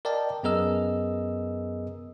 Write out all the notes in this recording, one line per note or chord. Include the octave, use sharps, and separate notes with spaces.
A#4 D5 D#5 G5 A5
F#2 B3 G#4 A#4 D#5 E6